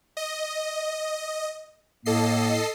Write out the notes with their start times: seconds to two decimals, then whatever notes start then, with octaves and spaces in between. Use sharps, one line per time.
0.17 D#5
2.06 A2 A#3 A4 D#5 C7